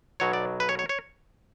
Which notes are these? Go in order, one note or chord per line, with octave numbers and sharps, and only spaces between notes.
B1 B2 F#3 C#5
D5
B4
C#5
C#5
C#5